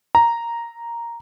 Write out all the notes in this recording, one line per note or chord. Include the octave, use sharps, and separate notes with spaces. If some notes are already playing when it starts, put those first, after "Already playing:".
A#5